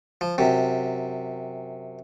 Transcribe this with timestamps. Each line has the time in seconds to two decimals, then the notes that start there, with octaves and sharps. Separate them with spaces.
0.21 F3
0.38 F#2 C3